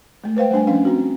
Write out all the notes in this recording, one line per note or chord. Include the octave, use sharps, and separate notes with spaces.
G#3 A3
B4 C5 F5 G5
G3 A3 D4 G#5
F3 C#4 D4 F5
C4 F#4